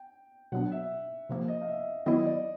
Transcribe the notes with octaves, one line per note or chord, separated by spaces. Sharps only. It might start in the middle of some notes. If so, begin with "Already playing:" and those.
Already playing: G5
B2 F#3 B3 D4 F#5
E5
C3 F3 A#3
D#5
F5
E5
D#3 F#3 B3 E4 D#5
D5